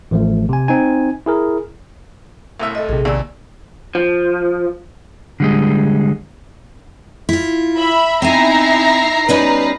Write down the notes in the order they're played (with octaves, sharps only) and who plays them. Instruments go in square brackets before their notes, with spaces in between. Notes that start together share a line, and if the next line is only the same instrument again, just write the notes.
[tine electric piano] A1 F3 A3
C3 G#5
C4 D#4 G#5
E4 G#4 A#4
[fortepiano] C2 A2 E5
[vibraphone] A4 D#5
[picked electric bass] A#1 C3 [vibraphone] G#4
[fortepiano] D#2 A#2 [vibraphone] D5 E6
[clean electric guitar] F3
[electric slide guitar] D3 G3 G#3
[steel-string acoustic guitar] E4 F4
[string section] E5 B5
[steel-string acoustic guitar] C4 G#5 [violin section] D#4 E4 E5 [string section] A#5 C7
[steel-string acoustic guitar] G3 C#4 D#4 [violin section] B4